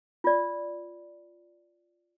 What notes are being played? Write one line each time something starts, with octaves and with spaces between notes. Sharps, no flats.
F4 D5